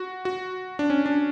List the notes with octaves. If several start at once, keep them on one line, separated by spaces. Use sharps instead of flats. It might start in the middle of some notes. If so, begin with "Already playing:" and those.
Already playing: F#4
F#4
D4
C#4
D4